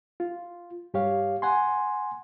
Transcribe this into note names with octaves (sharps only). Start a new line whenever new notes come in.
F4
G2 G4 C#5 F5
F#5 G#5 C6